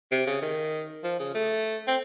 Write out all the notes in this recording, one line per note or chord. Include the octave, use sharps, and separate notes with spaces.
C3
C#3
D#3
F3
C#3
A3
C4